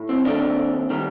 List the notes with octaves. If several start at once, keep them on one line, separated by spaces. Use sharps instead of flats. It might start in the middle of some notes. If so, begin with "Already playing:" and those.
Already playing: A2
C4
D#2 D#3 A3 C4 D4
D#3 G3